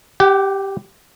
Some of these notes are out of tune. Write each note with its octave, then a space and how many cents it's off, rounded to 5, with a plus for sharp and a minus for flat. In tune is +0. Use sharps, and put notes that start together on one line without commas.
G4 +0 F#5 +45